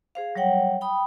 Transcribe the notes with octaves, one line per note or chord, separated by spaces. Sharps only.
G#4 C5 F5
F#3 G3 C#5 F#5 G5
G5 B5 D#6